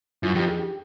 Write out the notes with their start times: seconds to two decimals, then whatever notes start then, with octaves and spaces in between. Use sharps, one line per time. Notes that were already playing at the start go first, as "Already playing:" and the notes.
0.23 F#2 F4
0.35 F2 G4
0.48 G#4
0.59 G4